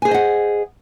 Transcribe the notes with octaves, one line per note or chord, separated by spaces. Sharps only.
G#4 C5 D#5 F#5 G#5